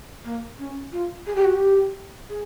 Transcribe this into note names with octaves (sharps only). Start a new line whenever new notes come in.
A#3
C#4
F4
G#4
G4
F#4
G4
G#4